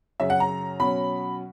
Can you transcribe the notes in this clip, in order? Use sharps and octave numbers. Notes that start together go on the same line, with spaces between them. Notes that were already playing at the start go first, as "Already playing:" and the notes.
F#2 C#3 F#3 C#4 E5
F#5
A#5
B2 F#3 C#4 B5